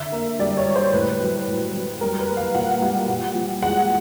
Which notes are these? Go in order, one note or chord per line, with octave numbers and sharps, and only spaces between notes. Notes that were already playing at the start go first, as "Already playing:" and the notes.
Already playing: D3 E5
A#3
G3 D5
C#5
G3
C5
A2 B4
F#3
A2
F#3
G3 A#4
B4
A#3
F5
A#2 F#5
G3
A#2
F3
G#3 F#5